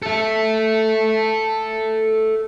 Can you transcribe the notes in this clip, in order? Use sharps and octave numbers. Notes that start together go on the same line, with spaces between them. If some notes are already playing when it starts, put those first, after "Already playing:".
A4 E5